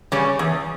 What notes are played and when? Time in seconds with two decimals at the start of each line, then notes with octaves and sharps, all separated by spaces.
0.12 C#3 G3 C#4
0.39 E2